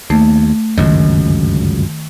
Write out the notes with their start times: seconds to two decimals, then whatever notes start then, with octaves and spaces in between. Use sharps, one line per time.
0.10 D#2 A3
0.78 G1 C#2 F#2 D#3